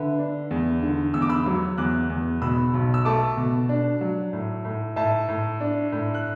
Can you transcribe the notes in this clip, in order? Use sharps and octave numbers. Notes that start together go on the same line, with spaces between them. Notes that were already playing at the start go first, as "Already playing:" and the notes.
Already playing: D3 B4 E5
D4
E2
D3
E2 E6
D6
B5 E6
F#3
E2 D6 F#6
E2
B2 B5 E6
B1
E6
A3 A5 D6
B2
D4
F#3
A2
A2
A2 E5 A5
A2
D4
A2
F#6